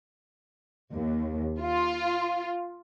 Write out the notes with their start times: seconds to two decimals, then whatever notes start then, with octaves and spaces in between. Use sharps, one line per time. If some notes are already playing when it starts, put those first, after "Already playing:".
0.94 D#2
1.63 F4